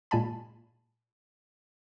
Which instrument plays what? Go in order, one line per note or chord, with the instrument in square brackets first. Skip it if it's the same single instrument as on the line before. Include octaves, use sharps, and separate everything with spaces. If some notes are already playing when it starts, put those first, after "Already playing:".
[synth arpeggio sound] A#2 G#3 G#5 A5 B5